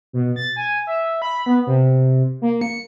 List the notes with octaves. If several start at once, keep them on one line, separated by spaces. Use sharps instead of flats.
B2
A6
G#5
E5
B5
B3
C3
A#3
C#7